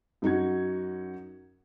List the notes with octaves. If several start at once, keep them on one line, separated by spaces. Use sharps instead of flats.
F#2 D#4 F#4 G#6